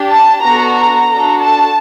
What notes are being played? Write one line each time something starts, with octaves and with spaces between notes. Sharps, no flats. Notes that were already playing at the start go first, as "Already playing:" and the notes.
Already playing: D4 G4
A5
B3 D4 F#4 A4 A#5
A#5
D4 F#4 A4
A5